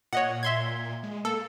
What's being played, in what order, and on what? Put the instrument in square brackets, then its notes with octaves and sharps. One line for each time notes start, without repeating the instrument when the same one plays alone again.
[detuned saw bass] A#2 [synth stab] C#5 D#5 F#5
[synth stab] E5 C6 G#6
[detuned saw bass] G#3
[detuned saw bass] A#3 [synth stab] A4